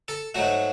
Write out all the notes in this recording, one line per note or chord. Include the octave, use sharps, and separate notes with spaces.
A4
G#2 F#3 A3 F#4